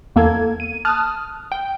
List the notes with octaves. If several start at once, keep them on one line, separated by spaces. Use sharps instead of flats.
E2 A#3 A4 G#6
D#7
A5 D#6 F6 F#6
G5